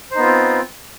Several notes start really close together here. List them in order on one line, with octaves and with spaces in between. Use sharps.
C5 D#4 B3 F4 C4